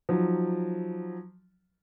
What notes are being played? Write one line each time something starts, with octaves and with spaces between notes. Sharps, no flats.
F3 F#3 D#4